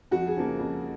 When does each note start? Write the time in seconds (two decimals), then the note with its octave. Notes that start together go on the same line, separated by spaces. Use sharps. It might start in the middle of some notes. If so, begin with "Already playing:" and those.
0.11 F2 F#4
0.27 G#4
0.36 C#3 F3 A#3
0.60 F2